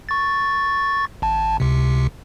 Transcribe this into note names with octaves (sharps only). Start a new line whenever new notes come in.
C#6 A6
G#1 A5
C#2 C3